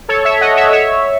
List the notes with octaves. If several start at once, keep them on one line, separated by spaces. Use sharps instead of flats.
A4 C#5
C#5 E5
D#5 F#5
C#5 E5
C#5 E5